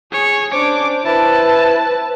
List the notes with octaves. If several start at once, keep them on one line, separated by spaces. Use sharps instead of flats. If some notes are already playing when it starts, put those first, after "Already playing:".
G#4 C#5
C#4 D4 C5 D6
E4 B4 A5